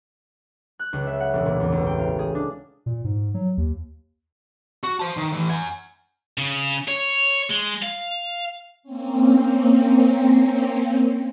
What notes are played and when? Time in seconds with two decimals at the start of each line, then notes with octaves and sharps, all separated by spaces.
0.79 F#6
0.93 C#2
1.07 E5
1.20 F#5
1.34 E1
1.45 A#2
1.60 E2
1.72 A1
1.86 G5
1.99 F5
2.19 G#4
2.35 D4
2.86 A#2
3.04 G#2
3.34 F#3
3.57 D#2
4.83 F#4
5.00 C5 A5
5.17 D#3
5.32 A2 E3
5.49 F#5 G#5
6.38 C#3
6.88 C#5
7.50 G#3
7.83 F5
8.83 A#3 C4 C#4